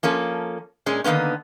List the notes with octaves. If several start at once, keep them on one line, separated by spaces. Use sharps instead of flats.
F3 A#3 C#4 A4
A#2 G#3 C#4
D3 D#3 A#3 B3 C#4